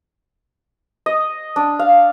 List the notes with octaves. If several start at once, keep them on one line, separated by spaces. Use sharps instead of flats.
D#5
D4
F5